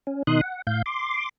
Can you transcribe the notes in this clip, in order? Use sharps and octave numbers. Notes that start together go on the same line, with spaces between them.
C#4
B2 D#3 D#4 C6 D#6 F#6
F#5
A2 F5 G6
C6 D6